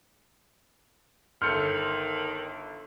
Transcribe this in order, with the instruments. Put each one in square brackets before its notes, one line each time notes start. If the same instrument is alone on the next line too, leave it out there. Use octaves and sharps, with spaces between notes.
[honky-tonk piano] G1 A4 C6 [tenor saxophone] D#3 [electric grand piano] F6 G6 C#7